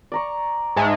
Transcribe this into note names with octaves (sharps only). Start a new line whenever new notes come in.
D5 A#5 C#6
G#2 G#3 E5 A5